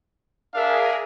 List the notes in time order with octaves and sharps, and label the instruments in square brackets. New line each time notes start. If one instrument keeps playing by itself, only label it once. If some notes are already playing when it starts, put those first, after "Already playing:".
[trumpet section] D4 E5 F5 [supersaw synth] G#4 A#4